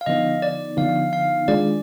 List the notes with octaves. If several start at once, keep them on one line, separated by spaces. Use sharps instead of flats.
F5
D3 F3 B3 D#4 D#5
D5
D3 F3 B3 D#4 F5
F5
D#3 G#3 D4 F4 G#4 D5